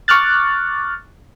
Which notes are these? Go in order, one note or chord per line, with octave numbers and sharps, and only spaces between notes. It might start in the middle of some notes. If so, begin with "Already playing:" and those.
C#6 D6 F6 F#6 A6